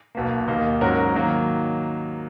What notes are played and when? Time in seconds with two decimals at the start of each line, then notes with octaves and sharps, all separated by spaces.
0.15 B1 B2 A#3
0.48 D#2 D#3 A#3 D#4
0.81 G#2 F#3 C#4 F#4 A#4
1.15 D#3 F#3 A#3